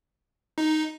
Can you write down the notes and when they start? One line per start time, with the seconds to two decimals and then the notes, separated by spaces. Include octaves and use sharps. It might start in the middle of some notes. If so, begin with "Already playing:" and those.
0.58 D#4